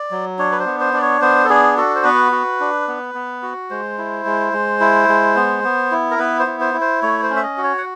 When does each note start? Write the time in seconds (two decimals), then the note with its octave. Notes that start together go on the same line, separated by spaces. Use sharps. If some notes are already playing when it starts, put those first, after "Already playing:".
Already playing: D5
0.11 F#3
0.39 D4 C#5
0.52 B4
0.60 C5
0.66 B3
0.80 C5
0.93 D4 D5
1.01 C#5
1.22 B3 C5
1.44 A4
1.49 D4 G#4
1.77 F#4 A4
1.95 C5
2.04 B3 B4
2.32 F#4
2.60 D4
2.88 B3
3.15 B3
3.43 F#4
3.70 G#3 C5
3.98 E4
4.25 G#3
4.53 G#3
4.80 E4
5.09 G#3
5.36 B3
5.64 B3
5.91 E4
6.11 A#4
6.19 B3 B4
6.39 C5
6.46 E4
6.60 C5
6.74 E4
6.81 C5
7.03 A3 C#5
7.23 C5
7.30 C#4
7.36 E5
7.43 D#5
7.58 F#4
7.64 C#5
7.78 F#5